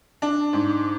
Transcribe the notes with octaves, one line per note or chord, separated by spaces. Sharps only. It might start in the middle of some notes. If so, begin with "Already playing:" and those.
D4
G#2